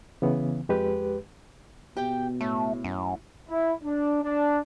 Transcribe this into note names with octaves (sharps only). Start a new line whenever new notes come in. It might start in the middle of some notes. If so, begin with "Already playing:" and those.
C#3 E3 B3
F2 G#3 G4 B4
B2 G4 G5
A2 A3
F#2
E4
D4
D4